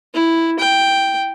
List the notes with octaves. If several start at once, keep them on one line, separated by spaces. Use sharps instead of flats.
E4
G5